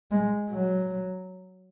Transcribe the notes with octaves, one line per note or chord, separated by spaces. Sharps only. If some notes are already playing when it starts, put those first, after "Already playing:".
G#3
F#3